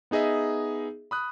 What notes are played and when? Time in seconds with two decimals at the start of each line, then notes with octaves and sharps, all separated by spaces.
0.11 B3 D#4 G#4 D#5 E5
1.11 B5 D#6 F#6